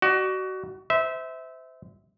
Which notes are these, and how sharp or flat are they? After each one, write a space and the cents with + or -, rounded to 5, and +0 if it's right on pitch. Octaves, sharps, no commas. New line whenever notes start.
F#4 +25 D5 +40
C5 -25 E5 -20